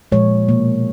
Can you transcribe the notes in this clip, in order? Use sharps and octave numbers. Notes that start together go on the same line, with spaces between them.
A#2 F3 G#3 C#5
B2 A#3